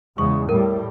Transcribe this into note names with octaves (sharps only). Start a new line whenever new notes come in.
E2 C#3 G#3 C#6
A2 G3 A#4